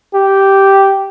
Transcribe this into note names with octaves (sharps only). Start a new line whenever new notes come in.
G4